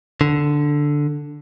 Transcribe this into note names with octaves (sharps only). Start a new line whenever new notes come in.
D3